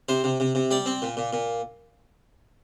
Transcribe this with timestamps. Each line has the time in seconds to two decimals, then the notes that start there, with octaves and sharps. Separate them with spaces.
0.09 C3 C5
0.24 C3
0.40 C3
0.55 C3
0.71 G3 D5
0.86 C4
1.02 A#2
1.17 A#2
1.33 A#2